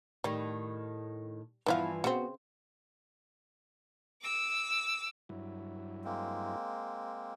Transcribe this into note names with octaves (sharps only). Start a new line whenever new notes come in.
A2 D#3 G3
G2 E3 F3 B3 E4 F5
C#3 B3 C4 F#4
D6 E6
G2 F#3 E4
G#3 A#3 C4